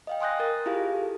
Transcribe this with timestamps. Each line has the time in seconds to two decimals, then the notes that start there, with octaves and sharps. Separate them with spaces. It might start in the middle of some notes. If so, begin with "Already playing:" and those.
0.07 D#5 F5 G5
0.20 G#5 C6 D#6 F#6 G6 A#6
0.39 A#4 D#6 A6
0.66 E4 F4 G4 G#4 F5
0.93 A4